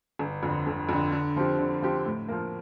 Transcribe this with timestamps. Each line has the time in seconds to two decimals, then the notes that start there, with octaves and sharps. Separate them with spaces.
0.19 G1
0.43 F2 D3
0.66 G1
0.89 F2 D3
1.12 D3
1.36 F3 C4 G4
1.58 D3
1.82 F3 C4 G4
2.06 A2
2.28 F3 A#3